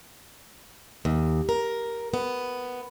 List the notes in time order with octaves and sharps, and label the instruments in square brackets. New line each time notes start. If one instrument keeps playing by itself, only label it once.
[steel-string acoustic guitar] D#2
A#4
B3